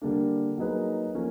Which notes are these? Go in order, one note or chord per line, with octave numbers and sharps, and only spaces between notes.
D3 G3 A#3 D4
F#3 A#3 D#4 G#4 B4
F3 A#3 C#4